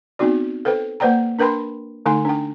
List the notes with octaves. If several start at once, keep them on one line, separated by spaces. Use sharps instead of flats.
B3 C4 D#4 F#4 D5
A4 B4 C5 G5
A#3 B4 C5 D5 G5 A#5
D4 A#4 B4 G5 B5 C6
D3 A3 D#4 G#5 C6
D4 G5